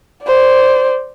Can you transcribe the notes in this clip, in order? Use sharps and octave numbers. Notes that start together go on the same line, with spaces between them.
C5 D5